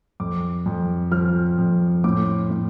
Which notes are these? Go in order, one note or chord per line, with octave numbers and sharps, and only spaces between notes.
F2 D6
F2
F3 F6
F2
A2 D6
A2